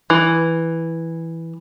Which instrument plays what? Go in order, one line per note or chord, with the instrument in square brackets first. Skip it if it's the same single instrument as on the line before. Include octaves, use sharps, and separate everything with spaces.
[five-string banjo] E3